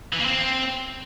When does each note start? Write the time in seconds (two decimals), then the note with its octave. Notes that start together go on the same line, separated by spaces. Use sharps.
0.13 E3
0.19 A#3
0.25 C4